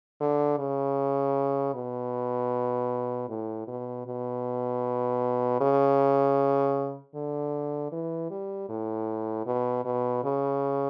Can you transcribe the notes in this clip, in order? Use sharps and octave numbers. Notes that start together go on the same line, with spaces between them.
D3
C#3
B2
A2
B2
B2
C#3
D3
E3
G3
A2
B2
B2
C#3